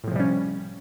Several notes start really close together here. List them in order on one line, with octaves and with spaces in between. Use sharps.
A2 F3 C3 G3 C#4